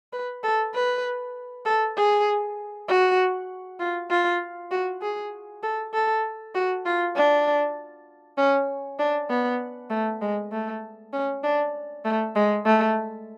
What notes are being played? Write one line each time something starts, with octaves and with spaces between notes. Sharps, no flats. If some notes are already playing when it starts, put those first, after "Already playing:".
B4
A4
B4
A4
G#4
F#4
F4
F4
F#4
G#4
A4
A4
F#4
F4
D4
C#4
D4
B3
A3
G#3
A3
C#4
D4
A3
G#3
A3